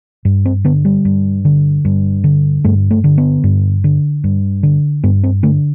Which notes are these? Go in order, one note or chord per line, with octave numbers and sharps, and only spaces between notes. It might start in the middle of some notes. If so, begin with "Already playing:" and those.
G2
C4
D3 B3
G3
G2
D3
G2
D3
G2 A3
A3
D3
B3
G2
D3
G2
D3
G2 B3
C4
D3 A3